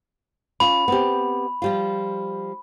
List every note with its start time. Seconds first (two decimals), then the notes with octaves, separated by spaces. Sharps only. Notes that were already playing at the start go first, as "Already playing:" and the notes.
0.60 C#4 F4 B5
0.88 B3 C4 G4
1.62 F3 G3 F4